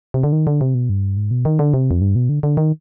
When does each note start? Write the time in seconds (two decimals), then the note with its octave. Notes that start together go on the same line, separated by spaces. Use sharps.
0.14 C3
0.23 D3
0.32 D#3
0.47 D3
0.61 C3
0.74 B2
0.89 G2
1.17 G#2
1.31 B2
1.45 D#3
1.59 D3
1.74 C3
1.91 F2
2.01 G2
2.16 B2
2.29 D3
2.43 D3
2.57 D#3